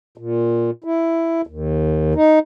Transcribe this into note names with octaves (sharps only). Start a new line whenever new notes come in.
A#2
E4
D#2
D#4